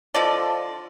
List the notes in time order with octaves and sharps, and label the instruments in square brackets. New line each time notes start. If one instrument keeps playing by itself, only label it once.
[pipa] D3 F3 D5 [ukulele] A4 D#5 A5